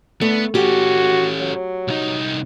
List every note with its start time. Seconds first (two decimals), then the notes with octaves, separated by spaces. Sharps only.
0.21 D3 A3 B3
0.55 C#4 F#4 G4 A4
1.40 F#3
1.88 C2 D#4